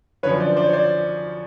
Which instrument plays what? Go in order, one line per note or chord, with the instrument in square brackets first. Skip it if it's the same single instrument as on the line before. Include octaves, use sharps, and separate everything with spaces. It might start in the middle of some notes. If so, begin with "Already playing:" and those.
[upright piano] F#2 D3 F3 B4 C#5
C5 D5
C5 D5
C#5
C5 D5